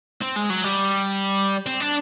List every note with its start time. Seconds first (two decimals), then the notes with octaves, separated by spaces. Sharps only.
0.21 C4
0.36 G#3
0.50 F#3
0.64 G3
1.66 C4
1.80 D4